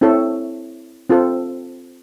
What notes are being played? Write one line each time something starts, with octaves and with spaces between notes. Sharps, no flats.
C4 E4 A4 C#5
C4 F4 A4 C5